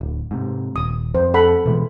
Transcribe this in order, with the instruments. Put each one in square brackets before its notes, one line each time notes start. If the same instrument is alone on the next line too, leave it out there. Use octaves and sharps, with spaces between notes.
[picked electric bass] D1
G#2 C3
[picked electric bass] D#1 [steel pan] D#6
[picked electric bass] F2 [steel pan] C5
[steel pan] A4 F#5 B5
[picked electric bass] B2 E3 G#3